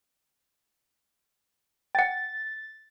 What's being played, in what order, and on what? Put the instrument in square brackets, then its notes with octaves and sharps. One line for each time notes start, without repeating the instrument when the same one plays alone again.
[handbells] F#5 G5 [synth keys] A6